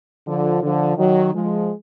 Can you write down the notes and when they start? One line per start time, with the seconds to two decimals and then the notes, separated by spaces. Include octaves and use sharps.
0.27 D3 F3
0.63 D3 F3
0.98 D#3 F#3
1.33 F3 G#3